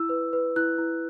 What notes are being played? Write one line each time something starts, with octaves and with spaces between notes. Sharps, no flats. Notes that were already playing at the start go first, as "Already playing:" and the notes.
Already playing: E4 E6
B4
B4
E4 F#6
E4